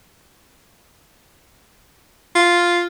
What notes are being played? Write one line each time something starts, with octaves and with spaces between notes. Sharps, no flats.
F4